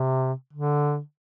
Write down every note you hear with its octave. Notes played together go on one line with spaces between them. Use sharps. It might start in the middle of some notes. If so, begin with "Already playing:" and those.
Already playing: C3
D3